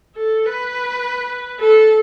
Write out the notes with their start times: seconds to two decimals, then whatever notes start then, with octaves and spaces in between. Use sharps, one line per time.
0.16 A4
0.46 B4
1.60 A4